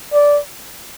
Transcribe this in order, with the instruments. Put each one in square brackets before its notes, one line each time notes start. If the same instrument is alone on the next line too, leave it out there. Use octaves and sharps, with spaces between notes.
[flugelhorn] D5